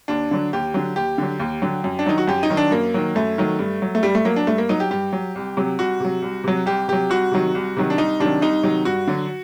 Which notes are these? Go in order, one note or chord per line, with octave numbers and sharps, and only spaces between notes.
D#2 D4
D3 F#3
D#2 G4
D3 F#3
D#2 G4
D3 F#3
D#2
D3 F#3
F#2
D4
D#3 F#3 D#4
F#4
F#2 G4
D#4
D#3 F#3
D4
F#2 A#3
D#3 F#3
F#2 A3
D#3 F#3
G2
F#3
A3
G2 G3
A3
F#3 A#3
D4
G2 A3
A#3
F#3 D#4
G4
G2 G4
F#3
C2
C3 F#3
C2 F#4
C3 F#3
C2
C3 F#3
C2 G4
C3 F#3 G4
C2 F#4
C3 D#3 F#3
C2
C3 D#3 F#3
D4
C2 D#4
C3 D#3 F#3 D4
C2 D#4
C3 D#3 F#3
G2 F#4
D3 F#3